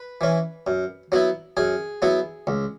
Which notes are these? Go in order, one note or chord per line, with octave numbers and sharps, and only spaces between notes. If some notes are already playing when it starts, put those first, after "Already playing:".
Already playing: B4
E3 C#4
F#2
F#3 B3 E4
F#2 G#4
F#3 B3 E4
C#2